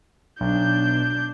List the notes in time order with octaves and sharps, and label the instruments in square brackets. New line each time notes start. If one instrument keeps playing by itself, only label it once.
[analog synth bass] B1 [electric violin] D4 G6